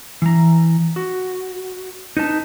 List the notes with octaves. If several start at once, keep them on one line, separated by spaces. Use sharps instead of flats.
E3 A#5
F#4
D#4 B4 A5